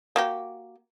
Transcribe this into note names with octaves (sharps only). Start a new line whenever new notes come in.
A#3 F#4 G4